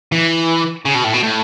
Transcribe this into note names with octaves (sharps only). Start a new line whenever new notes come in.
E3
C#3
B2
A2
B2
A2